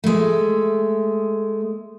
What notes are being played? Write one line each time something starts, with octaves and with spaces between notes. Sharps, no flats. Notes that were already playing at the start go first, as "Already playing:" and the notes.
G#3 A3